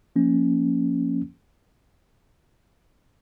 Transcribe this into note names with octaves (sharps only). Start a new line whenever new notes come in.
F3 A#3 C#4